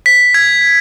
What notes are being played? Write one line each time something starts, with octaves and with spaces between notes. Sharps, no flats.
B6
G#6